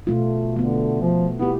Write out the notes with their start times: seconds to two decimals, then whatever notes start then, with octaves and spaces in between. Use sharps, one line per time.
0.07 B2 A3 F4
0.56 D3 A3 B3
1.01 F3
1.39 B3 E4 G4